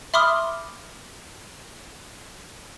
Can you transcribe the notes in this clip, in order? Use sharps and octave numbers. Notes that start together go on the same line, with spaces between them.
E5 B5 C6 D6 D#6 F6